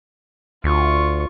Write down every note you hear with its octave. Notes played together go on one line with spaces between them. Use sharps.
D2 F4 C#6